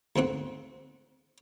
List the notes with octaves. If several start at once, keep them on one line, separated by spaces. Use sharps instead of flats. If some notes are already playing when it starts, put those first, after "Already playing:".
D2 G#2 C4 F#5